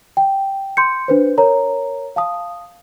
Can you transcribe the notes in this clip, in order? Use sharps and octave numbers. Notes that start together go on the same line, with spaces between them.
G5
C6 G6 C#7
D4 B4 C5
A#4 C#5 A#5
F5 A5 D#6